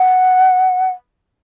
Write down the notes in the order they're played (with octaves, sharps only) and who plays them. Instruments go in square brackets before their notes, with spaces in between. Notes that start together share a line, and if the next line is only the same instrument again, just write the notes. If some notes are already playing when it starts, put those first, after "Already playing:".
Already playing: [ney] F#5